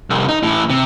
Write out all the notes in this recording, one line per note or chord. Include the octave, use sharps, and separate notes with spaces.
C2 F2
D#4
A2 E3
C3